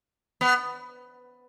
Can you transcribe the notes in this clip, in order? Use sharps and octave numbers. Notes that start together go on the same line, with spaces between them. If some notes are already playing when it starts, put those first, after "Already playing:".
B3